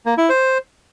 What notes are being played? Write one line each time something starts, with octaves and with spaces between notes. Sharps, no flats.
A#3
E4
C5